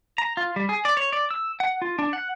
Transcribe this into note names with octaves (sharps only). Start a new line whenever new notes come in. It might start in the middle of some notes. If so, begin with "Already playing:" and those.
A#5
F4
G3
G#4
D5
C#5
D5
E6
F#5
F4
D4
F#5